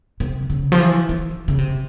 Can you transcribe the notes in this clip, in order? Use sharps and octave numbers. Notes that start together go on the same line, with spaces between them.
C3
C#3
F3
E3
E3
C#3
C3